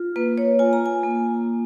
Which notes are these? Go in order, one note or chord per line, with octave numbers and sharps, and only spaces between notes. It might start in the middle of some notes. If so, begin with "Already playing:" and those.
Already playing: F4
A#3 B4
C#5
F4 G#5
A#5
G#5
A#3